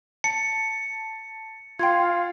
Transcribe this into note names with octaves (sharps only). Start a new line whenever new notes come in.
A5 C#7
F4 F5 G5 C6 G#6